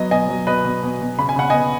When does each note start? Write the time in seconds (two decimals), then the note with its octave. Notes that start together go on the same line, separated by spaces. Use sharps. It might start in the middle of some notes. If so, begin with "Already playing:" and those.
Already playing: F#3 B3 D#5
0.11 B2 D#5 G#5
0.29 F#3
0.47 B2 B4 D#5
0.64 B2
0.83 B2
1.01 B2
1.19 C#3 B5
1.29 G#5
1.36 C#3 F#5
1.50 B3 D#5 G#5